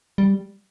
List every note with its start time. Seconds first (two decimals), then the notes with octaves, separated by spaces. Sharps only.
0.18 G3